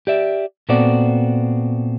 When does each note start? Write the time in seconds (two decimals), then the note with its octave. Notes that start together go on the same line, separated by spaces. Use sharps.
0.07 G4 D5 E5
0.69 A#2 B3 C4 F#4 A4 D5